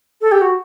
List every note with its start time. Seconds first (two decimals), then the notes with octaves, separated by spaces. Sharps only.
0.21 A4
0.31 G4
0.41 F#4